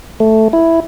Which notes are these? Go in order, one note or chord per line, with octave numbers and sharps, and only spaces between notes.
A3
E4